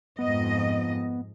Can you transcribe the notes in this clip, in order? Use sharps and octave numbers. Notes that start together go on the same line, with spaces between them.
F2 G#2 B3 D#5